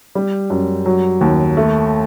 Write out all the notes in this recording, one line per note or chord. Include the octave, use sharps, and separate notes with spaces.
G3
F#2
F#3
D#2
A3